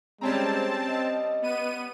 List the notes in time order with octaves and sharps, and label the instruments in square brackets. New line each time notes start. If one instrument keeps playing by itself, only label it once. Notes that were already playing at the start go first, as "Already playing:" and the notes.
[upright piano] G3 C#4 A#5 [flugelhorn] G#3 [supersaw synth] C4 A5
[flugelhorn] D#5
[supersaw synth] B3 D#7